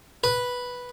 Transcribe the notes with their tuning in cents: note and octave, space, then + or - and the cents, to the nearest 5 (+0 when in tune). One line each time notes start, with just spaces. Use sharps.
B4 -5